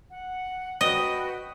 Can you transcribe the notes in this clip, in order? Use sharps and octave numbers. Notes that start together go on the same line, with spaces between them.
F#5
F#4 B4 D#5 G5